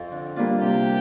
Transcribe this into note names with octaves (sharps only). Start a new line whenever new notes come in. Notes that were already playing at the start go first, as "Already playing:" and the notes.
Already playing: F2 F3
D3
G3 A#3 D4 F4
C3 G4